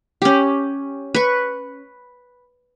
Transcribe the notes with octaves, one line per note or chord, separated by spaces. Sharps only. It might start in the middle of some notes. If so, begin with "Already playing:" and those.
C#4 G4
B4 C#6